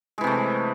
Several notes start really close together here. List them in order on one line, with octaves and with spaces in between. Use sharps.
G#3 E3 C3 A3